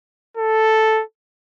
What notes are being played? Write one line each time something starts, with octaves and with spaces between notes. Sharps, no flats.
A4